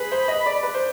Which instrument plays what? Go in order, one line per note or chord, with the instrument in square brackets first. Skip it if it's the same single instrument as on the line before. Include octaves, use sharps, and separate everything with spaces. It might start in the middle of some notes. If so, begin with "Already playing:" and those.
Already playing: [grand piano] G#4 B4 [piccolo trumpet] B5
[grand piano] C5
D#5
D5
B4
C5